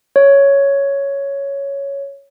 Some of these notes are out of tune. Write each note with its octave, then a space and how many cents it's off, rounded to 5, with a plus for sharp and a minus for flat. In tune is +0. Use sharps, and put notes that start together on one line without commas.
C#5 +5